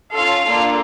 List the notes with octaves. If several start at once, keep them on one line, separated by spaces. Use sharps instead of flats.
C#4 F4 A4 F5
A#3 D4 F4 A4